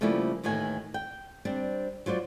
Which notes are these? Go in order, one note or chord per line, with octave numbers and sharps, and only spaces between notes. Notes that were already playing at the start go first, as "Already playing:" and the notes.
C#3 F3 G3 A3 A#3 E4
D#2 A2 D#3 E3 G#5
G5
G3 C4 D4
F#3 F4 C5 D5